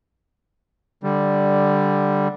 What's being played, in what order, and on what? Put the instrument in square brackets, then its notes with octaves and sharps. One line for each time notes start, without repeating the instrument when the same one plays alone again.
[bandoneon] D3 G3